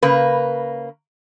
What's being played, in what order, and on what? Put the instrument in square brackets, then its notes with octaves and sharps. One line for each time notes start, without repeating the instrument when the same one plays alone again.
[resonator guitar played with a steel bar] C#3 A#3 B4